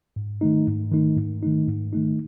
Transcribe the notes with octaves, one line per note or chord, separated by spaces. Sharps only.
G#2
D#3 A3 D#4
G#2
D#3 A3 D#4
G#2
D#3 A3 D#4
G#2
D#3 A3 D#4